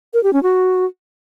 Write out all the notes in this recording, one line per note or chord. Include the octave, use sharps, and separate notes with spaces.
A#4
G4
C#4
F#4